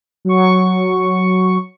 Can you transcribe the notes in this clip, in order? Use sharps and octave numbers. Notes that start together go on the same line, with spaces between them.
F#3 C#6